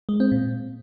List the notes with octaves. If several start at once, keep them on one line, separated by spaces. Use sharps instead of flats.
G#3
C4
A#2